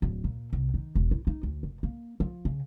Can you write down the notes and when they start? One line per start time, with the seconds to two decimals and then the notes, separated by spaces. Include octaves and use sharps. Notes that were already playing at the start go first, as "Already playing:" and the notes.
0.02 D1
0.24 A#2
0.53 C2
0.74 D#3
0.95 E1
1.11 E4
1.27 D#4
1.43 D2
1.63 F1
1.83 A#3
2.20 F3
2.45 C#3